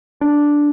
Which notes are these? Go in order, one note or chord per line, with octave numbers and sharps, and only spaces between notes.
D4